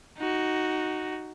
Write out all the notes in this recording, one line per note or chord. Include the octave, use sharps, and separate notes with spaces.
D#4 F#4